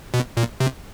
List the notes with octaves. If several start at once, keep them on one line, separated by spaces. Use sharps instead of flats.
B2
A#2
C3